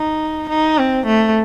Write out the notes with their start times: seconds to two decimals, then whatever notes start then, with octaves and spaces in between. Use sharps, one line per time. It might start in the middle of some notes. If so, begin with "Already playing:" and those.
Already playing: D#4
0.49 D#4
0.78 C4
1.06 A3